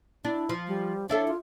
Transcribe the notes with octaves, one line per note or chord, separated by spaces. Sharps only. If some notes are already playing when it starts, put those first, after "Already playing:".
D4 E4
F3
G3
D4 E4 A4 C#5
F4